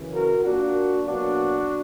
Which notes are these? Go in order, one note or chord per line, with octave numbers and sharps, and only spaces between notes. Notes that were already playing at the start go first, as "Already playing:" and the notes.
Already playing: F#2 C#3 E3
F#4 A#4
A#2 A#3 D4 F#4
B2 F#3 A#3 D4 F#4